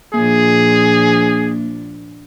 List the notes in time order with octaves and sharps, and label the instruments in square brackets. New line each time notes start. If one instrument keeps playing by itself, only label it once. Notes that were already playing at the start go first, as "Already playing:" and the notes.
[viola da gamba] A#2 F3 D4 [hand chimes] A#3 [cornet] G#4